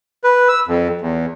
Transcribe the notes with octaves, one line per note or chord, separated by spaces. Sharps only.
B4
E6
F2
E2